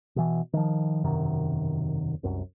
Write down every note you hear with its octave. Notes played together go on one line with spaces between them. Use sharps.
B2 E3
D#3 F3
E1 F#2 C3 D#3
C2 F#2